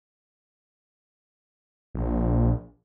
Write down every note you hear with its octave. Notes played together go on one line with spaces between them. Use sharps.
A#1